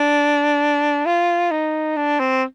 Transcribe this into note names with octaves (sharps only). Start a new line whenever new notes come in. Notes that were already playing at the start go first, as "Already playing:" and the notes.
Already playing: D4
F4
D#4
D4
C4